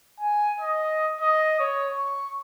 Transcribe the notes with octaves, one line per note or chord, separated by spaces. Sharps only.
G#5
D#5
D#5
C#5
C#6